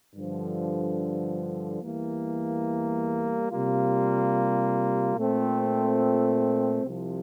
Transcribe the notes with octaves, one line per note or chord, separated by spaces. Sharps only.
G2 D3 F3
E2 E3 G3 A#3
C3 G3 A#3 F4
A#2 A3 C4
C2 C3 F3